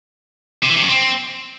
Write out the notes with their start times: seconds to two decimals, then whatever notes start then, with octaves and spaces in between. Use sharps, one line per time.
0.63 C3
0.70 E3
0.76 C3
0.82 F#2
0.89 C4